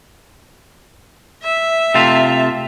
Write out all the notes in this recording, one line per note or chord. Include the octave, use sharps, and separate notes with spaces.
E5
C3 A3 F4